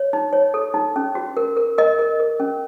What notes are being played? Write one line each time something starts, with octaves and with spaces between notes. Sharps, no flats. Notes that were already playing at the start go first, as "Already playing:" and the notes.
Already playing: C#5
D#4
C#5
A4
D#4
C#4
F#4
A#4
A#4
A#4 D#5
A#4
A#4
C#4